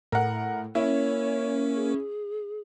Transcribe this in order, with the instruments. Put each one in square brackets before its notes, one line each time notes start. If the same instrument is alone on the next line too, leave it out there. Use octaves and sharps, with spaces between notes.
[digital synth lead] A2 [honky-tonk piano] A#4 F#5
[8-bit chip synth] A#3 A#4 [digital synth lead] C#4 [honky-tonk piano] E4 [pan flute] C#5
[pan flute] G#4